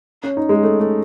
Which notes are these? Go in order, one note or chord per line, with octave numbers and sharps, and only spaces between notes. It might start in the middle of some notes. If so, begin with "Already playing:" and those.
C#4
D#4
G#3
A3
A3